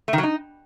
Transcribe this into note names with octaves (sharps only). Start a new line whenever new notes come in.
A3
D#3
F#3
D#4